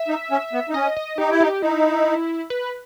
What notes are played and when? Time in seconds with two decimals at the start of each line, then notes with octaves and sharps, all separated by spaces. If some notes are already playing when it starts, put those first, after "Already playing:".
Already playing: E5
0.08 D#4
0.31 C#4
0.53 B3
0.69 D#4
0.74 C#4 D#5
0.97 D#5
1.18 D#4 G4
1.31 E4
1.40 D#4 G4
1.62 D#4 E4
2.50 B4